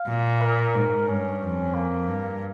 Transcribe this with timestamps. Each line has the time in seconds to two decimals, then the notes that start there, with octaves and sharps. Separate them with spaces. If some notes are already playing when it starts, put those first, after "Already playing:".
Already playing: F5
0.08 A#2
0.42 A#4
0.75 G#2
1.08 G2 C#4
1.41 F2
1.74 A#3
2.07 G2